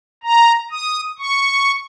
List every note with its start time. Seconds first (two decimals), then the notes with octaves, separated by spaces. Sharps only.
0.23 A#5
0.71 D#6
1.18 C#6